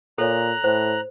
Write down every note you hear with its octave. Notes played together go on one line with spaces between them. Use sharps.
A#2 A4 C#5 A#5 F#6
A2 C5